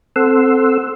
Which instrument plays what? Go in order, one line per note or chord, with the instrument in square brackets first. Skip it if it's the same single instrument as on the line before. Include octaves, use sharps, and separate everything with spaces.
[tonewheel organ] C4 A4 F#5 C6 E6